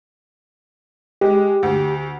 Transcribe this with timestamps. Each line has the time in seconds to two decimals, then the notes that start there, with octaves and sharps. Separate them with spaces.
1.21 G#3 G4
1.63 D2